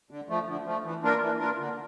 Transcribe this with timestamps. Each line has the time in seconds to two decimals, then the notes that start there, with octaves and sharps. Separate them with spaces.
0.11 D3
0.29 F3 A3
0.47 D3
0.66 F3 A3
0.84 E3
1.03 A#3 D4 F4 A#4
1.21 E3
1.39 A#3 D4 F4 A#4
1.58 D3